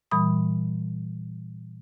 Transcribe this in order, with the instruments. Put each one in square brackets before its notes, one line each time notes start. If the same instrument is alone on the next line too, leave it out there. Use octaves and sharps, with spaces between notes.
[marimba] A#2 E3 G3 B5 D#6